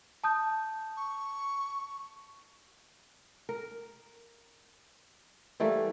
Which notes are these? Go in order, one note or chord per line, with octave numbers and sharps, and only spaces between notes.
A5 D#6 G6
C#6
A#4
E3 G3 A3 A#3